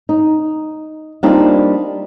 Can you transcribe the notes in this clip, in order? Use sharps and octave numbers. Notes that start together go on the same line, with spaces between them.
D#4
G3 A#3 C4 D4 D#4 F4